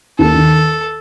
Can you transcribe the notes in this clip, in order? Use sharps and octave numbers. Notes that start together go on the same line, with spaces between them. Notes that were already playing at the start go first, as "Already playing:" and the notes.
D#2 A4
D#3